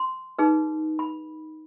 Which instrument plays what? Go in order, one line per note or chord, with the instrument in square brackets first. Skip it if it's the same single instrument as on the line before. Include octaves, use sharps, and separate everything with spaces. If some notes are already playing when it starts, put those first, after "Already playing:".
Already playing: [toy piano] C6
D#4 G#4 B4
B5